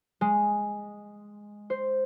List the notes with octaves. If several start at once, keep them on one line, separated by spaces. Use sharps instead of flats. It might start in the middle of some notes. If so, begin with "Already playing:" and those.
G#3
C5